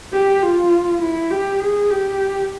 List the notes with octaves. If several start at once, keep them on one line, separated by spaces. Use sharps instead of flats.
G4
F4
E4
G4
G#4
G4